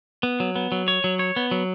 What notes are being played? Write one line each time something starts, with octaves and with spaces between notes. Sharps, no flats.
B3
F#3
B3
F#3
C#5
F#3
C#5
B3
F#3